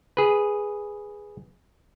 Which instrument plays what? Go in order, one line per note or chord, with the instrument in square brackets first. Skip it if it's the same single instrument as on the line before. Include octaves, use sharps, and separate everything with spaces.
[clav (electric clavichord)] G#4 B4